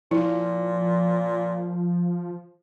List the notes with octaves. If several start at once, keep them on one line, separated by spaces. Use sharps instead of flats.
A#2 F3 E4